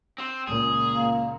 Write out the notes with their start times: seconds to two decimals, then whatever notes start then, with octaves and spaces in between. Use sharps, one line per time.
0.18 C4 C5
0.47 C#2 A#2 G#4
0.92 A#3